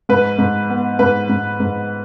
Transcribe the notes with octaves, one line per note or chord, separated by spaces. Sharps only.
G#2 B4
G#2
B3
G#2 B4
G#2
G#2